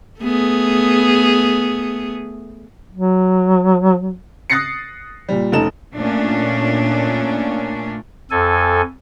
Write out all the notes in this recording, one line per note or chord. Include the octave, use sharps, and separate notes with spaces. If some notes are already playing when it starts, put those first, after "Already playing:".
A3 B3 G#4
F#3
D#6 F#6 A6 A#6 C7 C#7
A#2 G3
F1 C#4 D#4 A4 E7
A#2 A3 C#4 D4
F2 A4 G#5